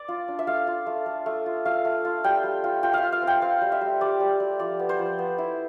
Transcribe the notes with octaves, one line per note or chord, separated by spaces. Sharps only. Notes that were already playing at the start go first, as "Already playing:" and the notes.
Already playing: D5
F4
D4
E5
A3 F5
F4
A3
A3
A3
F4
A3 F5
A3
F4
G3 G5
G3
F4
F4 G5
E5 F5
F4
F5
C4
G5
C4 F5
G3
E5
G3
G3 D5
G3
G3
F3 D5
B3
C5
F3
B3
E4